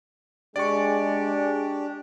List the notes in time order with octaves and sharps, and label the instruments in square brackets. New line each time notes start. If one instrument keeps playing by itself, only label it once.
[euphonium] G#3 [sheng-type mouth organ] D4 G4 [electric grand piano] D5 C#6